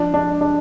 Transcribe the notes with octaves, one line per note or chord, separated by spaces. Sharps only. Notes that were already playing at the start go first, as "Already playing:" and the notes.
Already playing: F3 D4
D4
D4